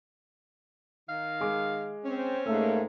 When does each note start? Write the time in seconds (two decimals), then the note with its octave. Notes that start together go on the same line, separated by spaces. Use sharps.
1.10 D#3 F5
1.41 G#3 G#5 D6
2.05 C4 C#4
2.46 G#2 A3 A#3 E6